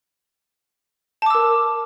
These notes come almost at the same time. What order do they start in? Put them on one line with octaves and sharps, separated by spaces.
A5 D6 E6 A#4